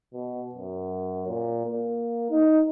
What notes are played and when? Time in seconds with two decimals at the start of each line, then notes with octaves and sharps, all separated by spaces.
0.13 B2
0.55 F#2
1.28 A#2
1.65 A#3
2.30 D#4